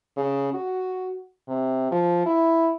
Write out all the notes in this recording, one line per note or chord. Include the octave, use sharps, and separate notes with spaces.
C#3
F#4
C3
F3
E4